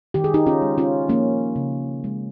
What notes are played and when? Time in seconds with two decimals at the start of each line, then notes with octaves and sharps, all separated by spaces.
0.14 D#3 G4
0.24 G#4
0.34 D#4 G4
0.46 C#4 F4
0.62 G#3
0.78 C#4 F4
1.09 F3 A#3 C#4
1.56 C#3
2.04 G#3